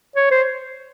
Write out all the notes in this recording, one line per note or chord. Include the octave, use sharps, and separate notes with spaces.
C#5
C5